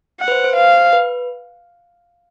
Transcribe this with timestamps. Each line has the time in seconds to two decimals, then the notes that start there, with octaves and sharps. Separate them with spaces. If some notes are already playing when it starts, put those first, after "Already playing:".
0.20 F#5
0.28 B4
0.32 C5
0.44 C5
0.56 F5
0.93 B4